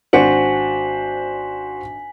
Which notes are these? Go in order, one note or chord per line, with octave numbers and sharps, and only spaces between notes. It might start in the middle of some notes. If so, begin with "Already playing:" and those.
G#1 D4 F#4 C5 G#5 B6 C#7 F#7